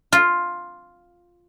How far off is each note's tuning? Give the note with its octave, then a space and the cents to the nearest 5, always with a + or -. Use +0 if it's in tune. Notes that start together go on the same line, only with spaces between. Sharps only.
F4 +5